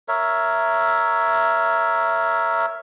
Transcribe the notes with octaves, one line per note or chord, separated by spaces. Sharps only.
A#4 C#5 E5